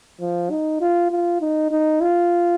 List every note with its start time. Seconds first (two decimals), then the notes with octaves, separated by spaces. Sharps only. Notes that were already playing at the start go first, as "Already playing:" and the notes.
0.20 F3
0.50 D#4
0.81 F4
1.10 F4
1.41 D#4
1.71 D#4
2.01 F4